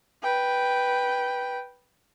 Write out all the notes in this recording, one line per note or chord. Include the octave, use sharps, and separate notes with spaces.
B4 G5